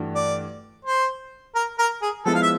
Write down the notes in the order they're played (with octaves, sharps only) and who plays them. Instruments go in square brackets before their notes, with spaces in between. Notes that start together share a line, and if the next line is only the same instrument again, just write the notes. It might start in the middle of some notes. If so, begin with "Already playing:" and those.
Already playing: [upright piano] G2 E3 A3 D4 F#4
[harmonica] D5
C5
A#4
A#4
G#4
[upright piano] F3 G#3 B3 E4 [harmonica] A4
[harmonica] F5
E5